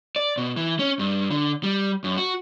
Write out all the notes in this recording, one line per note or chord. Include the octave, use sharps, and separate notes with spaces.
D5
B2
E3
C#4
G2
D3
G3
F#2
F#4